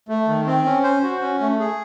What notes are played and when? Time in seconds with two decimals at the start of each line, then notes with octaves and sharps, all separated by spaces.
0.08 A3
0.28 D#3
0.47 C4
0.65 C#4
0.83 C5
1.03 F#4
1.22 C#4
1.40 A3
1.59 G#4